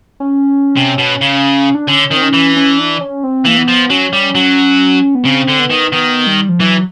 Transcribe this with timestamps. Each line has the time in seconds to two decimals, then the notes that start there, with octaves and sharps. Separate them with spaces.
0.20 C#4
0.76 C3
0.98 B2
1.21 C#3
1.75 D4
1.88 D3 C#4
2.11 D#3 C4
2.22 C#4
2.33 E3
2.57 C#4
2.78 D4
3.01 C#4
3.24 C4
3.45 E3 A#3
3.57 B3
3.68 F3
3.90 F#3 C#4
4.13 G3
4.35 F#3
5.15 B3
5.25 C#3 C4
5.48 D3
5.59 B3
5.70 D#3
5.92 D#3 B3
6.27 G3
6.49 F3
6.60 E3 F#3